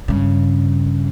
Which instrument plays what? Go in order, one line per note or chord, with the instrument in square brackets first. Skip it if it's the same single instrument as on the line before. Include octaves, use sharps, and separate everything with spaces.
[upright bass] G2 C#3